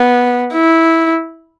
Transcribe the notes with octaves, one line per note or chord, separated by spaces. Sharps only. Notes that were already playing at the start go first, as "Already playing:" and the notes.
Already playing: B3
E4